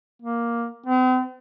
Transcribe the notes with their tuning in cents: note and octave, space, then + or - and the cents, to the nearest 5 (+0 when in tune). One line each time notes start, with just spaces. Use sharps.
A#3 +5
C4 -40